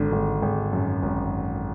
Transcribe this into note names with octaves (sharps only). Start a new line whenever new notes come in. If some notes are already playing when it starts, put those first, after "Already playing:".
Already playing: G#1 D3
G#1
G#1
F#2
G#1